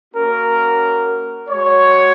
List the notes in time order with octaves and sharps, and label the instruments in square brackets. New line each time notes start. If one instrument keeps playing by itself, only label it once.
[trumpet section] A#3 C#4 F#4 A#4
G#3 F#4 C#5